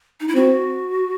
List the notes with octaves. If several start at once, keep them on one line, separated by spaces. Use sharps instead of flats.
D#4
E4
C4 F#4